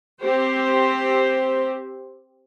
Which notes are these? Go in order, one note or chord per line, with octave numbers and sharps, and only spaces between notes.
C4 G4 C5